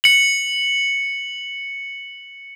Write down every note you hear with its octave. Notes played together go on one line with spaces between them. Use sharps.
C#7 F#7